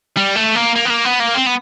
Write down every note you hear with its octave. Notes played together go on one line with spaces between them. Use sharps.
G3
A3
A#3
A#3
B3
A#3
B3
A#3
C4
B3